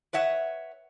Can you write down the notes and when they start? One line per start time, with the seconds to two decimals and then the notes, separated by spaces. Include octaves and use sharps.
0.13 B4 C#5 E5 F#5